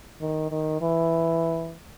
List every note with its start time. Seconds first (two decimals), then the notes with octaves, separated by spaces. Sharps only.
0.21 D#3
0.51 D#3
0.82 E3